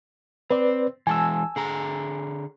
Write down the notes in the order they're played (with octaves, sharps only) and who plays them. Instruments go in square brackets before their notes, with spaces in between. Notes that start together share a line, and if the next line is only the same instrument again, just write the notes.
[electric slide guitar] C4 [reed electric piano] B4 D5
[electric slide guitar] E3 G#3 [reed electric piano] G#5 A5 E6
[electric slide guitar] D3 G#4 A#5